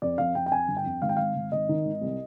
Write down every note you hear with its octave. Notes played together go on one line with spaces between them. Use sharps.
F2 D5
F2 F5
F2 G5
G5
F2 G#5
G1
G5
F2
G#1 F5
G5
G#1 F5
G#1
G#1 D#5
D#3
G#1
C2